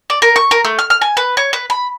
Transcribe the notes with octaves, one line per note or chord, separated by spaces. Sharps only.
D5
A#4
C#6
A#4
A3
F6
F6
G#5
B4
C#5
B4
B5